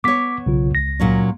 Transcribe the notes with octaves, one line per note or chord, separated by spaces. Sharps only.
B3 C#5 D6 B6
B1 C#3 F4
C#2 A#6
A#2 F#3 C#4